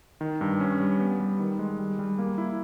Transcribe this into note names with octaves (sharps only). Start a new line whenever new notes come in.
D#3
G2
C#4
G3
B3
G3
D#3
G#3
G3
G3
A#3
E4